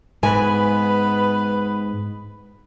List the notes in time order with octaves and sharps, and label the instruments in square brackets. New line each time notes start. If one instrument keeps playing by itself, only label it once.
[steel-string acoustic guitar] G#2 G#5 [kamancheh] B3 B4